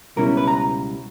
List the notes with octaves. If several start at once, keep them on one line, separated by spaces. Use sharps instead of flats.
C#2 B2 G3 C#4 E4 A#4
B4
A#5